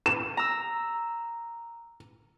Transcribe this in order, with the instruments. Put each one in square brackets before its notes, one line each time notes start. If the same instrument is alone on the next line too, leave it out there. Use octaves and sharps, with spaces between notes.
[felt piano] E7
[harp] A#5 E6